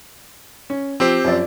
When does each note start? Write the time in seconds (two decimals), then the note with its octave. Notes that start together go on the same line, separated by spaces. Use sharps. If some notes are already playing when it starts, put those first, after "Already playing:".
0.70 C#4
1.00 F3 C4 G4 C5 E6
1.24 F#2 F3 D5